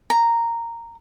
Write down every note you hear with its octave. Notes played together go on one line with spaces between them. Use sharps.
A#5